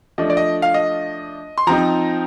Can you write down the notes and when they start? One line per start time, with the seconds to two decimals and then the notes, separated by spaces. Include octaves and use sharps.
0.18 F3 A3 D4 D#5
0.30 D5
0.37 D#5
0.62 F5
0.74 D#5
1.58 C6
1.67 F3 C4 D#4 A#5